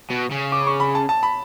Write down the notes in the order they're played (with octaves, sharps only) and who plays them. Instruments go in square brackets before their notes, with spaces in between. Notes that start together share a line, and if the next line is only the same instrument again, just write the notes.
[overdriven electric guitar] B2
C#3
[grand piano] D6
C#6
B5
A5
A5
B5